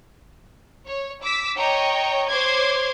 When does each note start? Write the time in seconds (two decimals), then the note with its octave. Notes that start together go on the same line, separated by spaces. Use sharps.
0.90 C#5
1.23 D6 E6 B6
1.59 C#5 D#5 G5 A#5
2.30 C5 C#5 C6 D6 G#6